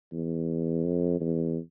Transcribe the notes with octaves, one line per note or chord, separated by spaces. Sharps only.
E2
F2
E2